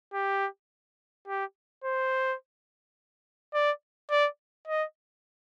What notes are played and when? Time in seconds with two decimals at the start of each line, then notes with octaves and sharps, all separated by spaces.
0.13 G4
1.27 G4
1.84 C5
3.54 D5
4.10 D5
4.68 D#5